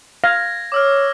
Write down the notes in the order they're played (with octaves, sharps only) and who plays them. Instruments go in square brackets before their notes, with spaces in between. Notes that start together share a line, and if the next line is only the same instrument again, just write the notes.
[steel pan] F5 [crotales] G#6 A#6
[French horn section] C#5 [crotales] D6 E6 F6